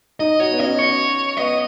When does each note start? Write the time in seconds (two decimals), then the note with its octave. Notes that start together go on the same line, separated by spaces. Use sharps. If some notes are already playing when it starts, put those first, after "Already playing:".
0.20 D#4 D#5
0.40 F#4 C#5
0.51 B3
0.59 C#4 D#5
0.79 C#5
1.37 B3 D#5